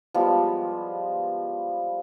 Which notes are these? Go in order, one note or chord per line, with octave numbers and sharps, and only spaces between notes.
F3 G3 G#3 B3